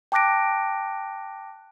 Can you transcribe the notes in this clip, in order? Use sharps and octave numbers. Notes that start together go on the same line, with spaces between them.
G5 A5 D6 F#6 A#6 D7